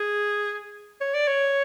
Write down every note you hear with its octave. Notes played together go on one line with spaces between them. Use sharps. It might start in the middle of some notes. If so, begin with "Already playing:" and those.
Already playing: G#4
C#5
D5
C#5